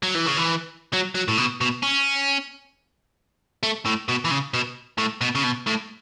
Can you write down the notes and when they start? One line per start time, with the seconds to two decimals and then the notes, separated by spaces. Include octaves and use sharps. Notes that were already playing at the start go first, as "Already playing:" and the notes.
0.03 F#3
0.15 E3
0.26 C#3
0.37 E3
0.93 F#3
1.15 F#3
1.28 A2
1.38 B2
1.61 B2
1.83 C#4
3.63 A3
3.86 A2
4.08 B2
4.25 E3
4.31 C#3
4.54 B2
4.98 A2
5.21 B2
5.35 C#3
5.43 B2
5.67 A2